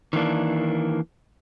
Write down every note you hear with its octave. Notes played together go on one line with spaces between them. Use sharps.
D#3 E3 A#3 D4